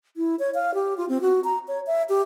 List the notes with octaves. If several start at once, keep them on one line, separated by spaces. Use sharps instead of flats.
E4
C#5
F5
G4
F4
C4
F#4
A#5
C#5
E5
G4